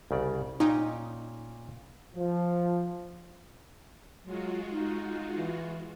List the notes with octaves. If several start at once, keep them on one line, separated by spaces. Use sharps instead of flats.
C2 C#3 D5
A#2 C#4 D#4 G5
F3
F#3 G#3 F4 F#4
D#4
E3